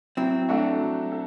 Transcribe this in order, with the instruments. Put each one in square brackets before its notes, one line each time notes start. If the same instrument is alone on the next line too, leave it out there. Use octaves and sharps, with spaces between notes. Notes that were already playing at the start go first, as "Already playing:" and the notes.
[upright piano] F#3 [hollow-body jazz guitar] C4 E4
[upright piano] A3 D4 F#4 A4
F#3
A4